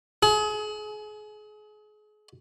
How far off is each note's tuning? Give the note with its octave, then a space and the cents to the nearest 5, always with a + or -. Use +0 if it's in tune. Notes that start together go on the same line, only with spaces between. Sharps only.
G#4 +35